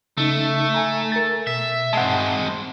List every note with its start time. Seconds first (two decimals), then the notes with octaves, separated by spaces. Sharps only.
0.18 C#3 A3 D#4
0.74 G#5 A#5
1.12 A#4 A6
1.47 B2 E5
1.93 G#3 C4 F#5 A5